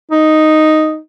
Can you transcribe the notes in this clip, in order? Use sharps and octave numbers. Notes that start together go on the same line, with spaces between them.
D#4